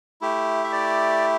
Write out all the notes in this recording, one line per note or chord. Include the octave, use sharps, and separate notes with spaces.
A3 E4 G4
E5
D5